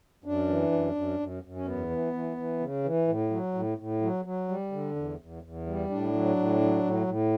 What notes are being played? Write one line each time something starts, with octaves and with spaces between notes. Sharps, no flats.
F#2 D4
E3
F#2
F#2
F#2
F#2
C#4
E2 B3
E3
E3
E3
C#3
E3
A2
F#3
A2
A2
F#3
F#3
G3
D3
E2
E2
E2
G3
A2 D4
F#3
A2
F#3
A2
A2